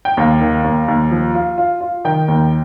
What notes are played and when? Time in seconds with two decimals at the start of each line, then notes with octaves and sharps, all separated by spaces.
0.05 G5
0.17 D#2 F5
0.41 D#3
0.64 D#2
0.88 D#2
1.11 F3
1.35 F4
1.58 F4
1.81 F4
2.05 D#3 G5
2.28 D#2